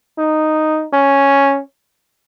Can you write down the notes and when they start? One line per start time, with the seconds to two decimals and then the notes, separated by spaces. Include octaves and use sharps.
0.18 D#4
0.93 C#4